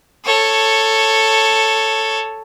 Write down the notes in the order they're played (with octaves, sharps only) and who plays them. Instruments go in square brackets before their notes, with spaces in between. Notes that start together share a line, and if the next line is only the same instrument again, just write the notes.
[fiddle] A4 C#5